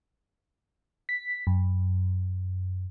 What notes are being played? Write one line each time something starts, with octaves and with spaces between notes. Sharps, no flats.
B6
F#2